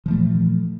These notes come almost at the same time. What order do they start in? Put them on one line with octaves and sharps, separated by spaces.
F3 E3 A3 A#2